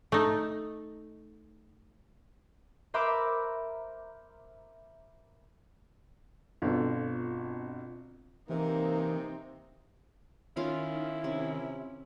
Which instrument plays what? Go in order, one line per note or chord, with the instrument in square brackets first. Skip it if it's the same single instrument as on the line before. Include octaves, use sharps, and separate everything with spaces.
[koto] A3 D#4
[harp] A#4 C5 E5 B5 D6 F#6
[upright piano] G1 B2 D3 [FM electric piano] C4 F4
[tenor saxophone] C3 [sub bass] E3 [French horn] A#3 [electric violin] C4 D#4
[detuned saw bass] D#3 [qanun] C#4 F4 F5 [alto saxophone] E4
[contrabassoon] C3 [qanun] C#4